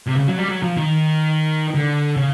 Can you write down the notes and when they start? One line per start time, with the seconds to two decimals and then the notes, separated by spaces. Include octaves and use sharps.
0.07 C3
0.17 C#3
0.28 F#3
0.38 G3
0.49 F#3
0.63 F3
0.77 D#3
1.75 D3
2.17 C#3